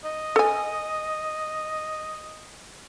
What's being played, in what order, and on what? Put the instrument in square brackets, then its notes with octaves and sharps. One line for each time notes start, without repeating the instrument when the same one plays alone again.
[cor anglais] D#5
[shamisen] A4 G#5